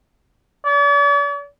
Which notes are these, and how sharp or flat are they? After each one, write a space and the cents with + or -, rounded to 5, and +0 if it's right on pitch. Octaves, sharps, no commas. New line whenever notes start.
D5 -45